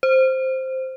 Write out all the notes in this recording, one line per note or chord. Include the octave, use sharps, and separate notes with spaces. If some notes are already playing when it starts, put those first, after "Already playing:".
C5